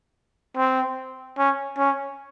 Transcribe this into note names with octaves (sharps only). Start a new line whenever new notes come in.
C4
C#4
C#4